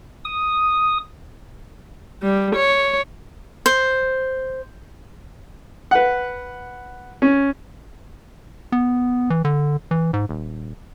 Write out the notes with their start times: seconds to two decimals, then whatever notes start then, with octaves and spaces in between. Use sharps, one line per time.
0.25 D#6
2.22 G3
2.55 C#5
3.66 C5
5.91 B4 F#5
7.22 C#4
8.72 B3
9.30 E3
9.45 D3
9.91 E3
10.13 G#2
10.29 D#1